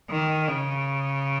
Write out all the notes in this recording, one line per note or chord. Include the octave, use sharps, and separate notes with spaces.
D#3
C#3